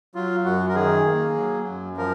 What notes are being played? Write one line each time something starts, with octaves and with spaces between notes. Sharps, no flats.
F#3 F4
F#2 F#4
A#4
D#3 G#4
A#3
F#3
F#2
F3 A#4